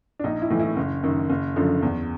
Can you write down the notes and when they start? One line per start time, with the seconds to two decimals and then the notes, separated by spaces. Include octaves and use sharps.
0.19 D4
0.24 A#1 D#4
0.42 E4
0.50 A2 E3
0.60 E4
0.77 F#1
1.03 F#2 D#3
1.30 F#1
1.56 F#2 D3 F3
1.82 E2